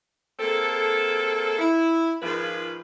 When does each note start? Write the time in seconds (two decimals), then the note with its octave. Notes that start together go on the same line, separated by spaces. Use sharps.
0.40 G#3 A#3 C4 A4
1.59 E4
2.22 G#2 D#3 F3 G#3 F4 B4